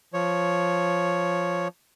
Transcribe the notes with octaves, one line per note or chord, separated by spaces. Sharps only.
F3 C#5